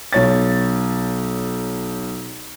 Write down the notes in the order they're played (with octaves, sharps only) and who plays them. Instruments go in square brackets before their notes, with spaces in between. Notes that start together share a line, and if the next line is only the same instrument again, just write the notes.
[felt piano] B1 C#5 A6